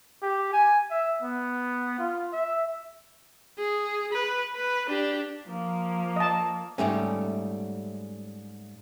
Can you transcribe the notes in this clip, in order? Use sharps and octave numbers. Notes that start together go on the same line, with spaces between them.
G4
G#5
E5
B3
F4
E5
G#4
B4
B4
D4 G4
F3 A#3
D#5 A5
G#2 G3 A3 C#4